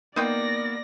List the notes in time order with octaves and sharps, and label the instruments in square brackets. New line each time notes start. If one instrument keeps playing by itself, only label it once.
[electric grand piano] A#3 B3 A#4 [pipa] D#4 F4 G5 [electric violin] D5 A#6